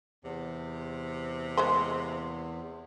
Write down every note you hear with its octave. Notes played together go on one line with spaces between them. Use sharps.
E2 C3
G#3 A#3 C5